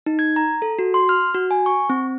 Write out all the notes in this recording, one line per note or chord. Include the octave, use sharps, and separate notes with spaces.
D#4
G#6
A#5
A4
F#4
C6
F6
F#4
G#5
C#6
C4